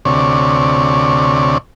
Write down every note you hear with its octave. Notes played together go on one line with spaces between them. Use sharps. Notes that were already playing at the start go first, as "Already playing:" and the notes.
D2 C3 C#5 D5